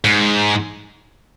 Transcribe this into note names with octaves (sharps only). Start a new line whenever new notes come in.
G#2